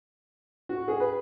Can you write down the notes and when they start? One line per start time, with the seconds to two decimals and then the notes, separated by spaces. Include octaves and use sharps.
0.69 F#4
0.88 G#4
1.00 B4